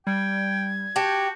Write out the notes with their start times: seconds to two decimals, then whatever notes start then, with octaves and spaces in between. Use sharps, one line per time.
0.07 G3 G5 G#6
0.96 F#4 G4 A5 G6